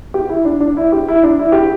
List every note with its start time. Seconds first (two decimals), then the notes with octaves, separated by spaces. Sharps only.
0.14 G4
0.30 E4
0.45 D4
0.60 D4
0.77 E4
0.92 G4
1.08 E4
1.23 D4
1.39 E4
1.52 G4